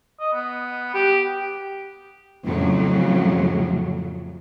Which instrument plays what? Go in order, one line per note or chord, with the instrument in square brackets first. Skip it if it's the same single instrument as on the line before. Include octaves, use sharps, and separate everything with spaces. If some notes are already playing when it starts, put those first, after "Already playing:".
[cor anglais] D#5
B3
G4
[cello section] F2 A2 C#3 F#3